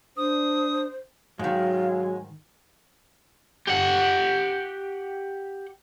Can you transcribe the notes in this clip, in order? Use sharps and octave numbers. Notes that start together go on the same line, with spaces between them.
D4 C5 D#6
G#2 D#3 F#3 G#3 F5
G4 F#5